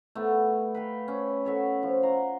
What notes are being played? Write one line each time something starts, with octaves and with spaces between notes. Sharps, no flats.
A3 B3 C#6
B4 F5 G5
C#4
A4 C#5 E5 F#5
F3
F#5 A#5 C6